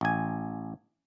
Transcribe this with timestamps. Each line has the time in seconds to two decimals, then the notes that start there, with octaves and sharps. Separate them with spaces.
0.01 A1 G#5